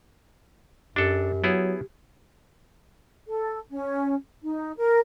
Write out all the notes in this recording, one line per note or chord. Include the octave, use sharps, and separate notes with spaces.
F#2 D4 G4 A4
F#3 B3 E4 G#4
A4
C#4
D#4
A#4